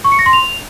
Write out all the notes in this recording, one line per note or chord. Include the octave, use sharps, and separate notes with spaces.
C#6
C#7
A#6
C6
F7